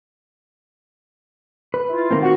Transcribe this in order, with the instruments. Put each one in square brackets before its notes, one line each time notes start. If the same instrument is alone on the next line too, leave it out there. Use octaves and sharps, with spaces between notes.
[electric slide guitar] B4
[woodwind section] E4 F4
[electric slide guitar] D#3 A#3 C4
[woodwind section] F#4